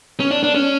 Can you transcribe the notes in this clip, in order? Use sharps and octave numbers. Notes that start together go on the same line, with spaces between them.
C#4
D4
D4
C#4